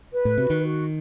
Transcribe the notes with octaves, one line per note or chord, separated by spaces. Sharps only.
B4
A2
C3 F#4
D#3
F#4